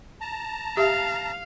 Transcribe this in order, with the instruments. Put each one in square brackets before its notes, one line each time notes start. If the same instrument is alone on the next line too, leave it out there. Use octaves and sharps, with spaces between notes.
[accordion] A5 A#5
[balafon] G4 E5 [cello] F5